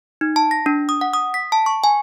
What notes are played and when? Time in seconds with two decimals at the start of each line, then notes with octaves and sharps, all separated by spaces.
0.21 D#4
0.36 A5
0.51 A#6
0.66 D4
0.89 D#6
1.01 F#5
1.14 D#6
1.34 B6
1.52 A5
1.66 C#6
1.84 G#5